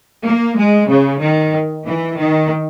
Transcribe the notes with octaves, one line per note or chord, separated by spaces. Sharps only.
A#3
G#3
C#3
D#3
E3
D#3